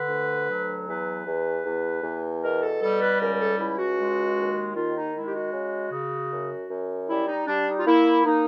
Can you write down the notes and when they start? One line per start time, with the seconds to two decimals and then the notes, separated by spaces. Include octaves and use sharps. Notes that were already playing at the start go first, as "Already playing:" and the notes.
Already playing: D3 B4
0.08 D2
0.48 F#3
0.86 E2 B4
1.26 E2
1.64 E2
2.03 E2
2.42 B2 A#4
2.62 A4
2.81 G3 A4
3.00 B4
3.20 C#2 A#4
3.34 A#4
3.39 A4
3.58 C#2 E4
3.78 F#4
3.98 G#3
4.36 D#2
4.75 D#3 F4
4.94 D#4
5.14 G#3 E4
5.26 G4
5.34 F#4
5.53 C#3
5.92 C#3
6.31 F#2
6.69 F#2
7.08 G3 E4
7.28 D#4
7.47 G3 D4
7.67 D#4
7.79 F4
7.86 A#3 E4
8.25 A#3 D#4